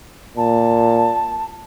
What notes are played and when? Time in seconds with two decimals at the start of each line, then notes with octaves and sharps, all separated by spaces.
0.37 A#2 A5